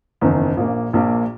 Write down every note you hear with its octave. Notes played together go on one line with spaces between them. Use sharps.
F#1 E2 D#3
A#1 A#2 A#3
A#1 A#2 A#3